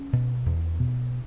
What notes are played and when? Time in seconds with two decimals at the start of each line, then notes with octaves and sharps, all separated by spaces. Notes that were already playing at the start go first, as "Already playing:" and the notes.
Already playing: C#4
0.13 B2
0.46 E2
0.79 B2